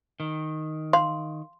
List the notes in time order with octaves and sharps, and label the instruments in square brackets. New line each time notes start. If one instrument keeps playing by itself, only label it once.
[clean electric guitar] D#3
[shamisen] F5 [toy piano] C6